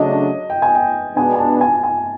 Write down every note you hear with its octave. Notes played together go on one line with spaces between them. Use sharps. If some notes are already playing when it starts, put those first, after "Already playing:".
Already playing: C#3 F#3 A3 D4 D#5
G5
G#5
G5
B2 G#3 B3 D4 G#5
G#5
A5
G#5
G#5